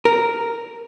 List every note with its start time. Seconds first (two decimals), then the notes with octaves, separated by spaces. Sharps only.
0.05 A#4